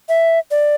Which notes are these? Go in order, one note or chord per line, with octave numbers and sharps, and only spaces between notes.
E5
D5